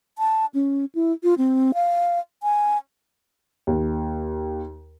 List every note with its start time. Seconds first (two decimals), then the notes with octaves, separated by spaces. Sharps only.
0.18 A5
0.54 C#4
0.95 E4
1.23 F4
1.38 C4
1.74 F5
2.43 G#5
3.67 D#2